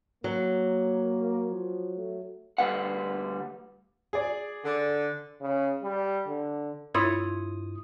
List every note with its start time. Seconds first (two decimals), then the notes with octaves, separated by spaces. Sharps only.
0.24 F#3 A#3
1.51 F3
1.97 A3
2.58 D2 G3 B4 F5 F#5
4.13 G#4 D5
4.65 D3
5.41 C#3
5.83 G3
6.27 D3
6.94 G2 E4 F4 C#5 D#6